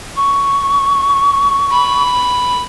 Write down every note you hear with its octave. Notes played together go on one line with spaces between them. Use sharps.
C#6
B5